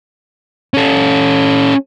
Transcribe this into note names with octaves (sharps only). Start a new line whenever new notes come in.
C#4 A4